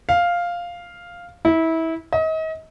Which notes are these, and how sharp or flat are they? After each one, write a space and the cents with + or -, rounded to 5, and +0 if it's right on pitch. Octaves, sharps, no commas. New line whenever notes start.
F5 +0
E4 -25
D#5 +35